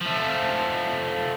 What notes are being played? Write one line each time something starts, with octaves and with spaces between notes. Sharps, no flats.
F3 A3